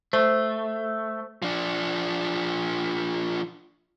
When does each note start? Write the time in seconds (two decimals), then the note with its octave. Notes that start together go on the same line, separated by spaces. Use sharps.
0.13 A3 C5
1.42 F3 D4